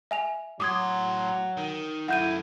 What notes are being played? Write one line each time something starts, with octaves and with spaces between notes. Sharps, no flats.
E5 G#5 F7
A2 F#3 C6 D6 D#6 G#6
D#3
F#2 A3 E4 F#5 G6 D#7